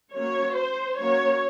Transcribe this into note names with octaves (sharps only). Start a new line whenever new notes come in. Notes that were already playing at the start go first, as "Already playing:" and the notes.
F#3 A#3 C#4 C#5
C5
F#3 A#3 C#4 C#5